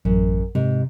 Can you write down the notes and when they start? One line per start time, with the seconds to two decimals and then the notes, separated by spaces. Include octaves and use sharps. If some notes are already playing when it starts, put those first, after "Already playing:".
0.05 A1 F#2
0.55 G#2 C3